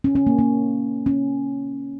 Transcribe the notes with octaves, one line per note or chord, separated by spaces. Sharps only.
C#4
C#4
A#3
A#3
C#4